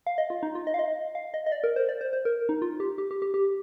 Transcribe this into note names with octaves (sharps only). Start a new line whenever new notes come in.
F5
D#5
F4
D#4
F4
D#5
F5
D#5
F5
D#5
D#5
D5
A#4
C5
D5
C5
C5
A#4
D#4
F4
G4
G4
G4
G4
G4